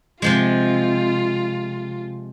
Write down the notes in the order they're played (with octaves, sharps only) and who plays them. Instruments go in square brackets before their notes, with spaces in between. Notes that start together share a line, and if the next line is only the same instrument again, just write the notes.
[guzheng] C3 F3 G#3 [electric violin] F4